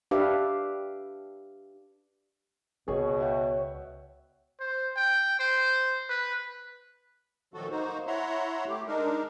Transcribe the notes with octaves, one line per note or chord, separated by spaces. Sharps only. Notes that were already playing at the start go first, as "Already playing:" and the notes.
D4 G4 B4 E5 F5
C#2 B2 G#4 C#5
E5 F#5 G5
C5
G5
C5
B4
A#2 D#3 F3 F#3 F#4 A4
A#3 D#4 F#4 C5
E4 C#5 E5 F#5 A#5 C6
A3 G4
G#3 D4 D#4 A#4